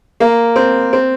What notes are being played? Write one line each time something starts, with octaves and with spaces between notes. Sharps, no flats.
A#3
C4
C4